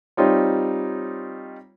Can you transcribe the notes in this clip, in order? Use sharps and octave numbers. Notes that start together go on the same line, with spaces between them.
G3 C4 D#4 F4 C#5